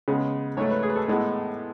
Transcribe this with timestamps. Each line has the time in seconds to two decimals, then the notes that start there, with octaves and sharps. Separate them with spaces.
0.08 C#3 G#3 B3
0.57 G#2 F#3 A3 C#5
0.70 B4
0.83 G#4
0.90 B4
0.96 A4
1.08 A2 G#3 B3